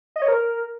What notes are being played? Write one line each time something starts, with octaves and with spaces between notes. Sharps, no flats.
D#5
C#5
A#4